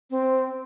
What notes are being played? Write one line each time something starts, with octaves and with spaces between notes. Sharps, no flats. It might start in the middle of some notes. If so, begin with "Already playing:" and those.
C4